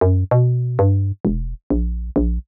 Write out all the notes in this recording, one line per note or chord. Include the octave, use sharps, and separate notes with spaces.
F#2
B2
G2
E1
A#1
A#1